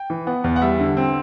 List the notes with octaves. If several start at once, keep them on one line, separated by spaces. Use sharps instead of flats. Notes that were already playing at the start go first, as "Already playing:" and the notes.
Already playing: G5
E3
B3 F#5
E2
F#5
G3 E5
D3
C4